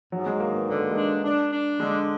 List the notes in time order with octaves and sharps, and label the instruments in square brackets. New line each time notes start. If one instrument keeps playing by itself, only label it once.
[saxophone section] G#2 [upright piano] F#3
[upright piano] G#3
[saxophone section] D#3 [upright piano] A#3
[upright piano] B3
[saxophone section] D3 [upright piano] B3
[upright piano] A#3
G#3
[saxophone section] D4
[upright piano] A#3
[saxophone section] D4
D4
[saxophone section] D3 [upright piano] G#3